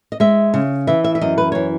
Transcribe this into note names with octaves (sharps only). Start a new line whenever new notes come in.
D#5
G#3 E5
C#3
E3 E5
E5
E5
F#2 D#5
B4
E3 C#5